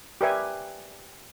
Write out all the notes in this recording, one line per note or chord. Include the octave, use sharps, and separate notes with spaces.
G4 A#4 B4 D5 E5 G#5